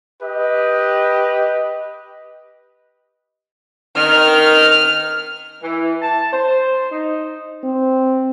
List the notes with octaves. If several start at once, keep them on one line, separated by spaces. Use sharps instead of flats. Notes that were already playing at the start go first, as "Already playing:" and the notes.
G4 B4 D#5
D#3 F6
E3
A5
C5
D#4
C4